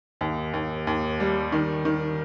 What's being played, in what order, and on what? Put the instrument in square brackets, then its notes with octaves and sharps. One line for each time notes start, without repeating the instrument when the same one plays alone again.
[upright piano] D#2
D#2
D#2
G3
D#3
D#3